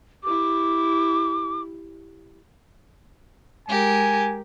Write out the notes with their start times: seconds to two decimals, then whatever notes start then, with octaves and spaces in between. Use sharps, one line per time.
0.24 E4 G4 D6
3.69 G#3 G4 A#4 G#5